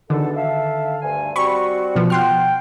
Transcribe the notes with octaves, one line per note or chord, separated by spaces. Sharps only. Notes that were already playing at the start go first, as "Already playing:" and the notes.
E2 B2 D3 D#3 A4
A4 E5 F5
D2 G2 G#5
G3 C4 F#4 B5 C#6
B2 F3 B3
F#5 G5 C6 F6